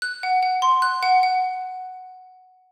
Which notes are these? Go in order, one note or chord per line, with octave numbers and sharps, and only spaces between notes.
F#6
F#5
F#5
C6
F#6
F#5
F#5